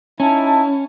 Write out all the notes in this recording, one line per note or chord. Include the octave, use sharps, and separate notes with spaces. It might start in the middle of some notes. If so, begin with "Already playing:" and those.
C#4 D#4 E4 A5